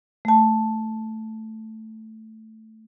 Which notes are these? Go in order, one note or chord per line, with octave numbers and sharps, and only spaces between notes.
A3 A5